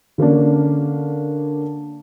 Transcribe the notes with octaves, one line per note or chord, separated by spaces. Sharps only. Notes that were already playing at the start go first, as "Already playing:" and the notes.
D3 A#3 C#4 D4